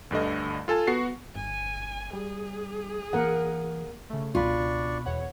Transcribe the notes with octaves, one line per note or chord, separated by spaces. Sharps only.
D2 G2 D3 D#5
F4 A4 G#5 A5
B3 F#4 C7
G1 G#5
G3 G#4
E3 A#3 A#4 F#5
C#3 A3
C#2 B2 D4 F4 D5 B5 C#6
E2 C#5 F#5